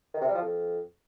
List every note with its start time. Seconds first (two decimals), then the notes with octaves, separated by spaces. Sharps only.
0.14 D#3
0.21 C3
0.28 G3
0.35 F3
0.42 F2